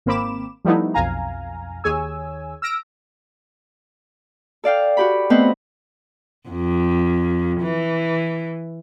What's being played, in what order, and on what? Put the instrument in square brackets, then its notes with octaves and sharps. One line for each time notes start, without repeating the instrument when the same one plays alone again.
[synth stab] G#1 A#3 C4 B5 D6 E7
F3 G3 A3 B3 D#4 E4
B1 F2 F5 G#5 A#5
D#2 G#4 C#5 G#5 E6
E6 F6 A#6 D7
[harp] A4 D5 F5 G5
F#4 G4 B5
A3 B3 C4 B4 C5 D#5
[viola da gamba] F2
E3